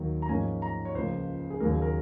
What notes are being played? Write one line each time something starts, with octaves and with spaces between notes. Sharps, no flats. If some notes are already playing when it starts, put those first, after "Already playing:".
Already playing: D#2 D#3 F#3 A#3
A#5
G#2 F3 A#3 C#4 G#5
A#5
C#5
C#2 C#3 F3 A#3 C5
G#4
D#2 C#3 F#3 A#3 A#4
G#4
A#4